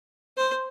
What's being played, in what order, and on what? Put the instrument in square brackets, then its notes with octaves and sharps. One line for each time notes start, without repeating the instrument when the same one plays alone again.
[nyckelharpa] C5